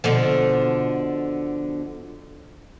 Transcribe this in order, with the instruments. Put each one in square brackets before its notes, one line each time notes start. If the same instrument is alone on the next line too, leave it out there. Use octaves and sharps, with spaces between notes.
[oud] B2 D3 F3